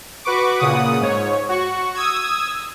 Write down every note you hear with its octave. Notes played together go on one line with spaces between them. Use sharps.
F#4 B4 C#6 D6
A#2 C#3 F#5 D#6
G#2 C#5
F#4 C#6
D#6 E6 G#6